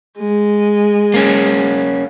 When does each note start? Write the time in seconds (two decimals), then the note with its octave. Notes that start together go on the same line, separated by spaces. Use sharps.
0.19 G#3
1.14 A#3 C#4